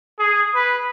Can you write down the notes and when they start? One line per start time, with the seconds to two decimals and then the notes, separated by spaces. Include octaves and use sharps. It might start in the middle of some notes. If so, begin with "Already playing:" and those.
0.19 G#4
0.55 B4